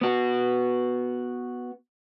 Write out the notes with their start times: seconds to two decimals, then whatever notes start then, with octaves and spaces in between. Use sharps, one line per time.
0.01 B3 F#4